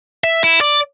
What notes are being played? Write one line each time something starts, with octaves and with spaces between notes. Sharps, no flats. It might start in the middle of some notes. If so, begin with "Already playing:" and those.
E5
E4
D5